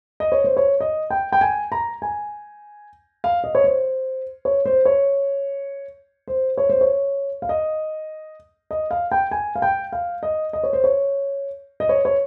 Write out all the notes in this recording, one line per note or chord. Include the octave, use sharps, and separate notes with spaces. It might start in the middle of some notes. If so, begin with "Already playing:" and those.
D#5
C#5
C5
C#5
D#5
G5
G5
G#5
A#5
G#5
F5
D#5
C#5
C5
C#5
C5
C#5
C5
C#5
C5
C#5
F5
D#5
D#5
F5
G5
G#5
F5
G5
F5
D#5
D#5
C#5
C5
C#5
D#5
C#5
C#5